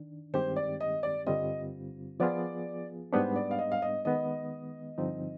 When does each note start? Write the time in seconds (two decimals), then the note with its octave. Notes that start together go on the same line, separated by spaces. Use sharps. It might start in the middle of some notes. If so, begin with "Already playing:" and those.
Already playing: D#3 D4
0.34 G2 D#3 G#3 C4 G4 C5
0.56 D5
0.81 D#5
1.03 D5
1.27 G2 D3 G3 C4 F4 D#5
2.20 F3 B3 F4 G#4 D5
3.13 G#2 G3 B3 D4 C5
3.36 D5
3.51 F5
3.59 D#5
3.72 F5
3.82 D#5
4.05 D#3 G#3 B3 D#5
4.98 G2 D3 F3 C4 D#4